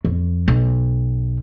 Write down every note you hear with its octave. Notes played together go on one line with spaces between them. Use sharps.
F2
B1